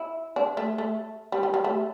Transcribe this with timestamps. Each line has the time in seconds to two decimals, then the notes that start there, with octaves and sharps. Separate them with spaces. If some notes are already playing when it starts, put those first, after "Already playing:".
Already playing: E4
0.36 D4
0.57 A3
0.78 A3
1.32 G3
1.43 G3
1.54 G3
1.64 A3